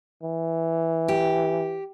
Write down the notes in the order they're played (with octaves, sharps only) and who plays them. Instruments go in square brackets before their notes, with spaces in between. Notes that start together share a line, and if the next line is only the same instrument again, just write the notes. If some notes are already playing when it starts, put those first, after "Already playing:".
[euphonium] E3
[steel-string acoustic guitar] G4